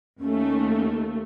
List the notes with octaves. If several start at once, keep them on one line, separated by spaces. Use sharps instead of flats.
D#2 A3 C#4